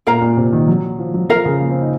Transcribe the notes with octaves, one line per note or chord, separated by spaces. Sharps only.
A#2 A#4 F5 A#5
A#2
C3
D#3
F#3
F3
F#3
F3 F4 A#4 F5
C#3
A#3
C4
D#4